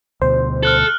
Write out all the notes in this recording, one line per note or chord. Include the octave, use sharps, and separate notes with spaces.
D2 B2 C5
A4 F6 F#6 F#7